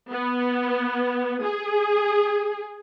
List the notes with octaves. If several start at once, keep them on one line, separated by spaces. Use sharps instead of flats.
B3
G#4